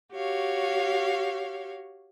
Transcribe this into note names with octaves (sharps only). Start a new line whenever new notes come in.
F#4 G4 C#5 F5